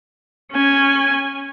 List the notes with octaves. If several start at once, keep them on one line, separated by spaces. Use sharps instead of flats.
C#4 G#5